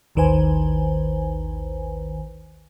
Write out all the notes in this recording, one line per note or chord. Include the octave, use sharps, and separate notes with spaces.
A1 D#2 D#3 B4 C5 G#5